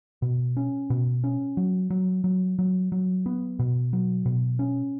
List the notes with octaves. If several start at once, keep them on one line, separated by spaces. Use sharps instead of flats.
B2
C#4
B2
C#4
F#3
F#3
F#3
F#3
F#3
B3
B2
F#3
B2
C#4